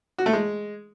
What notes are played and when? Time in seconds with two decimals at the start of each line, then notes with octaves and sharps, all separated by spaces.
0.18 F#4
0.26 A3
0.33 G#3